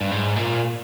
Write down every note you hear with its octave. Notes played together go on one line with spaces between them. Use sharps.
G2
G#2
A#2